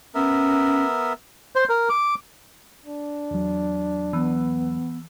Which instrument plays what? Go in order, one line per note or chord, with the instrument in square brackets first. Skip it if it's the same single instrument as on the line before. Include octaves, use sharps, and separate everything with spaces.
[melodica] B3 A#4 E5 [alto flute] C#4
[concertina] C5
A#4
D6
[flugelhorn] D4
[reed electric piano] E2 F#3
[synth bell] E3 [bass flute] B3